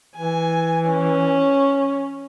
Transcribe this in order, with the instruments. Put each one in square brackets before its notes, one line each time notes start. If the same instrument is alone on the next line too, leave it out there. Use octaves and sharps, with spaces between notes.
[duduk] E3 [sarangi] G#5
[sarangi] C#4